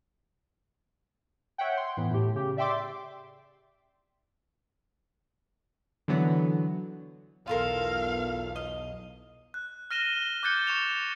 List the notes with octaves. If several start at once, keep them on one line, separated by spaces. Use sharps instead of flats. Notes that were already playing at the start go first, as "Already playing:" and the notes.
C#5 E5 F#5 G5
C6
A2 E3 B3
A2 G4
C#3 G4
D5 E5 G5 C6 D6
D3 E3 F#3 B3
B1 E2 F4 A4 A#4 F5
D#5
F#6
F6 A#6 D#7 E7 G7
D6 F#6 G6 A6 C#7 G7
C#6 E7 F7